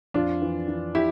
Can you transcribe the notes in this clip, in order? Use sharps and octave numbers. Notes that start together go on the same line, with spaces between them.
F2 D4 F4
E3
E3
E4 G4